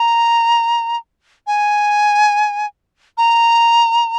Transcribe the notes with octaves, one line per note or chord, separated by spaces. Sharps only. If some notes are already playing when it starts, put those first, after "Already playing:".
Already playing: A#5
G#5
A#5